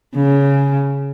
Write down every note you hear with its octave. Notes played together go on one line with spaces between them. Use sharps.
C#3